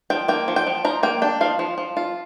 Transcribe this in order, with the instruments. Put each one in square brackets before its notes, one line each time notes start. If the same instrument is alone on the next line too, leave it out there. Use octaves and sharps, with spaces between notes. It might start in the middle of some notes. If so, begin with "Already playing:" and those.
[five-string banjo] F3 G5
A#3 G5
F3
G5
F3
F3 A#5
A#3 G5
D4 G5
F3 F5
F3
F3
F4